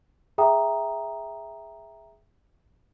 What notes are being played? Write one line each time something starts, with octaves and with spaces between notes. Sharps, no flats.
G#4 E5 G5 A#5 D#6